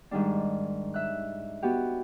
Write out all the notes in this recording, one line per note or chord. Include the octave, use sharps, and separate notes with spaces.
G#2 D#3 G3 D4
E5 F#6
B3 F#4 G4